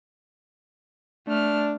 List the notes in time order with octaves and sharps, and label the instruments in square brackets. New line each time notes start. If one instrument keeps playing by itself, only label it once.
[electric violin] A3 F6 [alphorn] D4